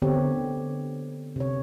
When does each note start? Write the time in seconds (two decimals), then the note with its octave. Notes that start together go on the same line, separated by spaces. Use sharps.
0.02 D3 B3 C4 G4 C#5
1.36 C3 C#5